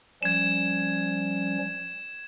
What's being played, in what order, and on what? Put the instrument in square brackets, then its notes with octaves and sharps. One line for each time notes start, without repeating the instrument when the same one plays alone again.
[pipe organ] F3 G3 C#4 [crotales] G#6 E7